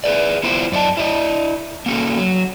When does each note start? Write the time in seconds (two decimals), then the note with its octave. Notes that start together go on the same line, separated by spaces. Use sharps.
0.04 G#4 B4 D5
0.43 B3 E4 F4 G4 C5
0.72 F#2 D5 D#5 A5
0.97 E4 D5 D#5
1.86 A#3 C#4 F#4 A4
2.18 F#3